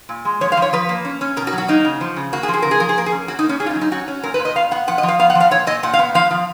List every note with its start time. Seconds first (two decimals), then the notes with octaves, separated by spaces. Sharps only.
0.09 A#2
0.25 G#3
0.41 F3 C#5
0.52 F5
0.57 F3
0.62 C#5
0.73 F3 B4
0.89 A#3
1.05 C#4
1.21 C#4
1.37 B2 A#4
1.47 F#4
1.53 F#3
1.58 F#4
1.68 A#3 D#4
1.85 C#3
2.01 F3
2.16 C#3
2.33 A#3 F#4
2.43 G#4
2.48 F3
2.53 G#4
2.62 C#3 A#4
2.71 G#4
2.80 F3 A#4
2.89 G#4
2.96 A#3 A#4
3.06 G#4
3.12 C#4
3.28 A#3 F#4
3.39 D#4
3.44 A#3
3.49 C#4
3.60 C#4 G#4
3.66 F4
3.70 D#4
3.76 F#3
3.81 D#4
3.91 C#4 F#4
4.08 C#4
4.23 A#2 A#4
4.34 B4
4.39 A#2
4.45 D#5
4.55 B3 F5
4.71 B3 F#5
4.87 F3 F#5
4.98 D#5
5.03 F3
5.08 F5
5.19 B3 F5
5.30 F#5
5.35 F3
5.40 F5
5.51 A#2 C#5
5.67 A#2 D#5
5.83 A#2 F#5
5.93 F5
5.99 B3
6.14 F3 F5
6.31 F3